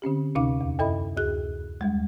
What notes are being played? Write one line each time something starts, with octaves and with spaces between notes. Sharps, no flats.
D3 C4 C#4 G4
D2 C3 C#4 D#4 F5 D6
E2
F#2 E4 A4 D#5 E5 B5
D2 F#4 G#4 F#6
D#2 G3 G#3